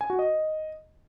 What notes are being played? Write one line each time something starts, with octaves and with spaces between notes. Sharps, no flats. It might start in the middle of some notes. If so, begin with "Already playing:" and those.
G#5
F#4
D#5